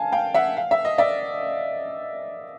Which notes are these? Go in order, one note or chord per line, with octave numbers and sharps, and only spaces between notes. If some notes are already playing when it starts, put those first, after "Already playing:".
Already playing: F5 G#5 A5
F5 G5
E5 F#5
F5
E5
D#5
D5 E5